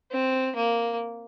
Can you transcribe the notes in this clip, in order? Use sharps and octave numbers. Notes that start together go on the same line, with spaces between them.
C4
A#3